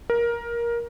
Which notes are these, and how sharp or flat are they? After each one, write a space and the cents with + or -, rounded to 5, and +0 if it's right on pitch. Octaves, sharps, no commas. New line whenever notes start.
A#4 +15